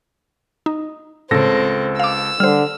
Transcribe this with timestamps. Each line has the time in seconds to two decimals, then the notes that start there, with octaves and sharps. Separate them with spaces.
0.66 D#4
1.31 C#2 A2 C#3 C4 A4 A#6
2.00 F5 D6 E6
2.40 D3 G3 C5 F6